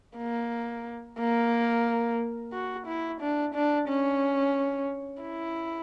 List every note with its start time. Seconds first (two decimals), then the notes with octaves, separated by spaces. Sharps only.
0.17 A#3
1.19 A#3
2.53 F#4
2.87 E4
3.21 D4
3.54 D4
3.88 C#4
5.22 E4